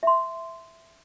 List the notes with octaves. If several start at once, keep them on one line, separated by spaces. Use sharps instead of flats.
E5 C6